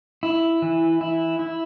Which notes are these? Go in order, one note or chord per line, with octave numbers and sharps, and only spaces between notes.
E4
E3
E4
E4